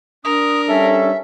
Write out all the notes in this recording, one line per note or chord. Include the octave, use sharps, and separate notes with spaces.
D4 A#4 D#6
G3 C#4 A4 E5